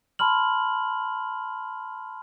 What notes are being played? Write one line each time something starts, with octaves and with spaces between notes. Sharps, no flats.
A5 B5 C6 F6 F#7